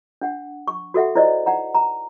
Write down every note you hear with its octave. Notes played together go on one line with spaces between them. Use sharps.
D4 F#5
C#6
F#4 A4 E5 F#5
E4 C5 D5 D#5
D#4 F#5 A#5
A#5